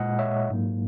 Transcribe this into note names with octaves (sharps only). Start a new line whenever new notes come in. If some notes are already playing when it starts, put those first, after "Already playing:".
Already playing: A#2 G#3 D#5 F#5
C#5 E5
G#2 F#3 A#3